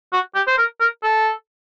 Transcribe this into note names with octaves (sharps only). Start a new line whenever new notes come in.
F#4
G4
C5
A#4
A#4
A4